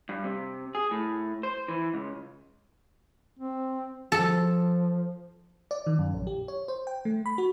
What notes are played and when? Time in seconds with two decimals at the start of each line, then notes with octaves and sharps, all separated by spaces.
0.09 G2
0.24 C3
0.75 G#4
0.91 A2
1.43 C5
1.68 E3
1.94 C#2
3.39 C4
4.12 F3 A4
5.71 D5
5.87 D#3
5.99 F#2
6.14 A#1
6.27 G4
6.48 C#5
6.68 C5
6.87 G5
7.05 A3
7.26 B5
7.38 F#4